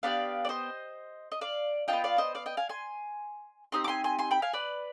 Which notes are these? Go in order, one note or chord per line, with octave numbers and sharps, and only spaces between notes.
B3 D4 G4 D5 F5
D5
C5 D#5
D#5
D5 F5
D4 F4 D#5 G5
B3
D5 F5
C5 D#5
D5 F5
D#5 G5
F5 G#5
G#5 C6
C4 D#4 G4 C6 D#6
D6
G#5 C6
G#5 C6
G#5 C6
G5 B5
F5 G#5
B4 D5